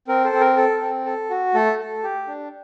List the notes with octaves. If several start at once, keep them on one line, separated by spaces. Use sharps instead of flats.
C4 A#4
A4 C5
C4
A#4
A4
C4
A4
F#4
A3 A4
A4
G4
D4